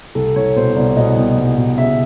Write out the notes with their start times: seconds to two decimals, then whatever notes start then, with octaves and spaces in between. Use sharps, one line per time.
0.15 C2 A4
0.36 C2 C#5
0.56 B2 C5
0.76 C2 D5
0.97 B2 D#5
1.17 C2
1.37 C2
1.58 B2
1.78 C#3 E5